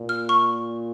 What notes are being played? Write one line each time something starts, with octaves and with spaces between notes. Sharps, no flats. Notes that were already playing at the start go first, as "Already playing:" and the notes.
Already playing: A#2
F6
C#6